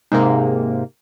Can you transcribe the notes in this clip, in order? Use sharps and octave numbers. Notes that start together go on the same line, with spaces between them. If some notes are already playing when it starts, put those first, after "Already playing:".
G#2 C3 A#3